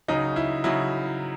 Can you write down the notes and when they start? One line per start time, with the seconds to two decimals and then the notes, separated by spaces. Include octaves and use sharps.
0.08 C#3 F#3 D#4
0.36 E4
0.64 C#3 F#3 E4